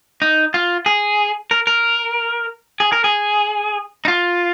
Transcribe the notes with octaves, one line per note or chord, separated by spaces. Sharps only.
D#4
F4
G#4
A#4
A#4
G#4
A#4
G#4
D#4
F4